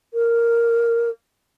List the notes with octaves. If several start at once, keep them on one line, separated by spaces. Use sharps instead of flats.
A#4